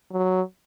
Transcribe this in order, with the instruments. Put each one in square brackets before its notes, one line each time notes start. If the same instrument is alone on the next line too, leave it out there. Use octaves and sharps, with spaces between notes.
[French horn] F#3